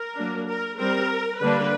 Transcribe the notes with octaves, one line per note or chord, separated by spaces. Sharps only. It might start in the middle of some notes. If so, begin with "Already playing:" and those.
Already playing: A#4
F#3 A#3 D4
A#4
G3 C4 A#4
D3 G3 A#3 D4 B4